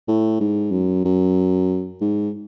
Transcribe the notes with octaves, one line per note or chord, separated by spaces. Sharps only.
A2
G#2
F#2
F#2
G#2